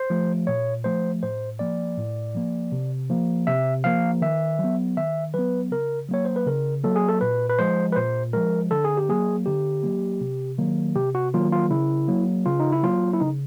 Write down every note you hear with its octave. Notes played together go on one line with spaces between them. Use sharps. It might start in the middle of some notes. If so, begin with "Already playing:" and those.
Already playing: C5
F3 A3
A#2 C#5
F3 A3 C5
A2 C5
F3 A#3 D5
A2
F3 A#3
C3
F3 A#3
C3 E5
F3 A#3 F5
D#3 E5
F#3
B3
D#3 E5
F#3 B3 B4
C#3 A#4
F#3 A#3 C#5
C5
B4
C#3 A#4
F#3 A#3 A4
G#4
A4
A#2 B4
B4
F3 G#3 C5
B4
A#2 C5
F3 G#3 A#4
D3 A4
G#4
G4
F#3 A#3 G#4
D3 G4
F#3 A#3
C3
D#3 F#3 A#3
C3 G4
F#4
D#3 F#3 A#3 F4
F4
C#3 E4
F#3 A#3
C#3 F4
D#4
E4
F#3 A#3 F4
E4
C#3 D#4